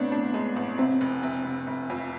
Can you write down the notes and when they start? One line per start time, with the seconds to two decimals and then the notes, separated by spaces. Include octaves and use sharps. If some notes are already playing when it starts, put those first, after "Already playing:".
Already playing: A1 A3 B3 C4 D4
0.12 D4
0.34 G#3
0.56 A1
0.78 C3 C4
1.01 F1
1.23 C3
1.45 F1
1.67 F1
1.90 F2